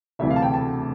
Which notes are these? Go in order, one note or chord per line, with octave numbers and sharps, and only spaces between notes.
E1 D2 C3 E3 E5
F5
A5
G5
A5